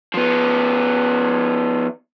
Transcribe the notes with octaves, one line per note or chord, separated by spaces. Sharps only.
F3 B3